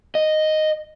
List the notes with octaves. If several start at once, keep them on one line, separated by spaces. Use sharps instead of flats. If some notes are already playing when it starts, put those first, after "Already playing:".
D#5